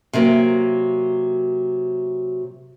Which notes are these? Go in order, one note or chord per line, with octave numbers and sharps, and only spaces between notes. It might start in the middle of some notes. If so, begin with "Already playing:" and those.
C3 F#3 A#3